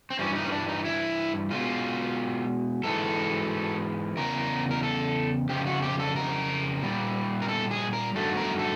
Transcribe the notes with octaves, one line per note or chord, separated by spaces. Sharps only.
C4
G2 E3 G3 C#4
D#4
C#4
D4
D#4
E4
B2 G#3 F4
G#2 E3 G#3 A4
E2 C#3 A#4
A#4
A4
F2 C#3 G4
F#4
G4
A4
A#4
A#2 G3
A#4
A4
G#4
A#4
G2 D#3 F#3 A3 A4
A#4
A4